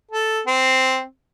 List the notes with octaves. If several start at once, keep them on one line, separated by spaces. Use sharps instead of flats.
A4
C4